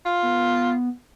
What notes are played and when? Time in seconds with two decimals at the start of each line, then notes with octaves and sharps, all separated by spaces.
0.06 F4
0.23 B3